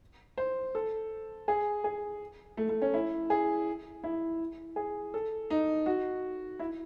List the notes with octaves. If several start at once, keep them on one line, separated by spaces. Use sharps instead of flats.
C5
A4
G#4
G#4
A3
A3
C#4
E4
G#4
E4
G#4
A4
D#4
F#4
E4